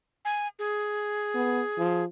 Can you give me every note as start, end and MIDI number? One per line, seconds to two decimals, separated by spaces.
0.25 0.48 80
0.59 2.04 68
1.34 1.61 59
1.77 2.05 53